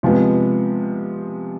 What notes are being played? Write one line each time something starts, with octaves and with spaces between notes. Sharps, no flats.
C3 F3 G#3 B3